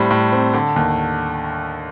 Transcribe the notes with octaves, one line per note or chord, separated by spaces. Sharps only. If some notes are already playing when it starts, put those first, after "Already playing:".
Already playing: A2 G3 C4
A2
C4
D3
D#2